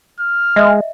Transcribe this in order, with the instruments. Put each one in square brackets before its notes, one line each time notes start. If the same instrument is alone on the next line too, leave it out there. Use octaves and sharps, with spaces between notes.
[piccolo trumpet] F6
[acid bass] G#3 [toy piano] D#5 E5